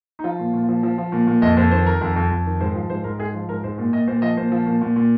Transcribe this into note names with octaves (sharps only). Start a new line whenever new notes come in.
D#4
F3 F4
A#2
A#2
F3
F3
F3
A#2
A#2
F2 D#5
F2 C5
D#3 C5
D#3 A#4
F2
F2
F2
D#3
G#2 C5
F3
G#2 C5
G#2 A#4
G#2 G#4
F3 F4
G#2 A#4
G#2 C5
A#2
A#2 D#5
A#2 C5
F3 D#5
A#2 C5
F3
A#2
A#2
A#2